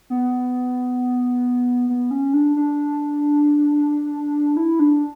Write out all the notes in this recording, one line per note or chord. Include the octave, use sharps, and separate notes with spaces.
B3
B3
C#4
D4
D4
E4
D4